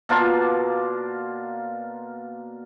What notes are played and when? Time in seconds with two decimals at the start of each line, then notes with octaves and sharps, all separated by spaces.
0.09 B2 A#3 D4 F4